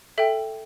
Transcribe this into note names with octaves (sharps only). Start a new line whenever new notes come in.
A4 E5 G5